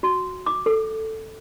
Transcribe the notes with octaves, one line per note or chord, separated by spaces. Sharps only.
F#4
D6
A4